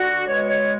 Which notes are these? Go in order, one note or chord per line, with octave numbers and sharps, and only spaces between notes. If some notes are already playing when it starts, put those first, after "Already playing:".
Already playing: D3 F#4
B2 G#3 C#5
C#5